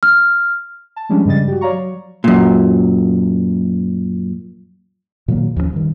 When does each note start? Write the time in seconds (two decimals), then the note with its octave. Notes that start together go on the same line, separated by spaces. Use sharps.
0.03 F6
0.96 A5
1.09 F3 G3 G#3 C#4 D4
1.25 G2 C#3 G3 D#5 A6
1.48 F#4 G4
1.61 C#5 D5 F5 A#5 C#6
1.72 F#3
2.24 F#2 A#2
5.28 A#2 D#3 F#3 A#3
5.56 D#2 F3 G#3 C#4
5.73 G2 D#3